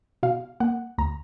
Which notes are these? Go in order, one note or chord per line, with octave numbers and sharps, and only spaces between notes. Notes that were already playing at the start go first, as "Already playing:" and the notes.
B2 F5
A#3 F#5
D2 A#5